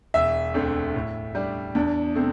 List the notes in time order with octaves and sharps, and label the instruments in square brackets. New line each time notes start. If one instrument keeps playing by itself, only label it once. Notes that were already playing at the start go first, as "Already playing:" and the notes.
[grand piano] E1 [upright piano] E5
[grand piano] D2 D3 A3 C4
A2
G3 D4
[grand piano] E2 [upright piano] D4
[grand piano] C3 A3 C4